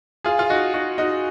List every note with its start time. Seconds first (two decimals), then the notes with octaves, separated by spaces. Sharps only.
0.25 F4 G#4
0.39 F4
0.50 D#4 F#4
0.74 D#4 F#4
0.98 D#4 F#4